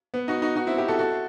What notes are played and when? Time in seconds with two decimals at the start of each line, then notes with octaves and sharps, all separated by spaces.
0.14 B3
0.28 D#4 F#4
0.42 D#4 F#4
0.56 D#4 F#4
0.67 C4 E4
0.77 E4 G4
0.88 F#4 A4
0.99 F#4 A4